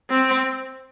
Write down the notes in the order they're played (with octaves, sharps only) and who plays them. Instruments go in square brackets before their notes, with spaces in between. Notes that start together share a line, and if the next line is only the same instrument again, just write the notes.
[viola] C4